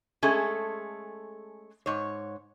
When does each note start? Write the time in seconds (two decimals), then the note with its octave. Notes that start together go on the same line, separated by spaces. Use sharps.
0.23 G#3 A3 C#4 G#4 A4
1.86 G#2 C#5